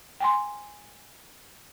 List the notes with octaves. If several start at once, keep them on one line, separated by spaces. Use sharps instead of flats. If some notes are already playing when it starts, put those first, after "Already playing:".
G5 G#5 C6